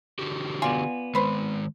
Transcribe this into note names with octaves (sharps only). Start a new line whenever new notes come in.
D3 F#4 G4
B3 F4 D5 G#5
D#3 G#3 B4 C5